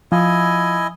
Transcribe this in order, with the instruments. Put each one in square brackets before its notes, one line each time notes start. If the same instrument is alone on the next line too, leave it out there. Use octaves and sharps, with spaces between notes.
[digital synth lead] F3 [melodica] E4 D#5 G#5